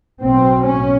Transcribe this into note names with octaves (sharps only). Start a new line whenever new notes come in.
B1 B2 C4
C#4